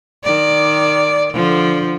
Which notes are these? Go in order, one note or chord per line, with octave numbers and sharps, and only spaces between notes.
D#3 D5
D3 F3